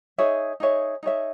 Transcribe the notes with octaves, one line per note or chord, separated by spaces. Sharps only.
D#4 G#4 C#5 E5
D#4 G#4 C#5 E5
D#4 G#4 C#5 E5